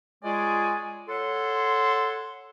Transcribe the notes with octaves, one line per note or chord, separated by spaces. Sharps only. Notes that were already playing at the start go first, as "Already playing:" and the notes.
G#3 F4 G#4 C#5 D5 G#5
A4 C#5 F#5 C6